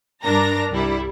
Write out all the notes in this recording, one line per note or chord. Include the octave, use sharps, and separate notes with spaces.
G2 D4 A#4 A#5 A#6
C2 G3 E4